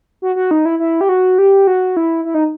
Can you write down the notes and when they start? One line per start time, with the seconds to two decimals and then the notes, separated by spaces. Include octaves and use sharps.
0.22 F#4
0.36 F#4
0.51 D#4
0.65 E4
0.79 E4
1.01 G4
1.09 F#4
1.38 G4
1.67 F#4
1.97 E4
2.25 E4
2.34 D#4